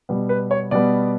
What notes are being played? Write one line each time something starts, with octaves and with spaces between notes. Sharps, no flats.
B2 G3 B3
B4
C#5
B2 G3 B3 D5